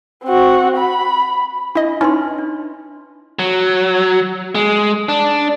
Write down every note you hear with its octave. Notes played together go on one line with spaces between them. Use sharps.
C4 F#4
B5
D4 E4 D#5
C#4 D#4 E4 B4 C6
D4
F#3
G#3
D4